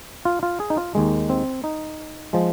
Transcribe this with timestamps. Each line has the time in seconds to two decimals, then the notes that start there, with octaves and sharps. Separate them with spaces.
0.25 F4
0.43 F4
0.60 G#4
0.70 D#4
0.77 F4
0.95 D#2 D#3 G#3
1.30 C4
1.64 D#4
2.33 F3 G#3